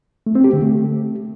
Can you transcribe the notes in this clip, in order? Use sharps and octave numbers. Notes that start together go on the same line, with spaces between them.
A3
C4
G4
D3
A3